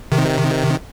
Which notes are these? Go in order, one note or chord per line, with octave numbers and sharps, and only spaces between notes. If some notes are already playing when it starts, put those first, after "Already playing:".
C3 D#3